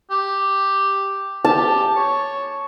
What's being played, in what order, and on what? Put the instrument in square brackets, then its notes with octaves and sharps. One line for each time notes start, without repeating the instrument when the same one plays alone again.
[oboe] G4
[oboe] G4 [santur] A5
[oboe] C#5